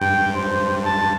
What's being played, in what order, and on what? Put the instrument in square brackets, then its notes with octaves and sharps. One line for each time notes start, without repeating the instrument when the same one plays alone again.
[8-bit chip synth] G2 [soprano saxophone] G5
[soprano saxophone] C5
A5